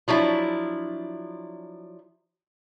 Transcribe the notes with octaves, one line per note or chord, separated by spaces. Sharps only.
F3 F#3 D4 E4